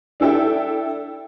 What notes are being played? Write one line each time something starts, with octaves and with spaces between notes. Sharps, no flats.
D4 E4 A4 E5 G5